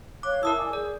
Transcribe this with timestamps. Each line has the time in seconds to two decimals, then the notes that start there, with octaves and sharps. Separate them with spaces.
0.23 C#5 F5 D6 F#6
0.43 E4 A#4 A5 D#6 E6
0.57 D5 G#5 D6
0.73 G#4 D5